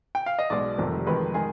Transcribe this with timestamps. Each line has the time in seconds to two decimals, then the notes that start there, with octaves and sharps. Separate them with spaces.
0.15 G5
0.26 F5
0.39 D#5
0.50 B1 B2 G#3 D5
0.78 F1 F2 C3 D#3 G3
1.07 F2 D#3 G#3 B4
1.34 D#3 G#3 G#4